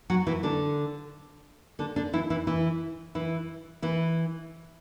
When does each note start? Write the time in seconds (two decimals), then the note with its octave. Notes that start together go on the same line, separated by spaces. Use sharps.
0.10 F#3 F#4
0.27 E3 E4
0.43 D3 D4
1.79 D3 D4
1.96 D3 D4
2.13 E3 E4
2.30 E3 E4
2.47 E3 E4
3.15 E3 E4
3.82 E3 E4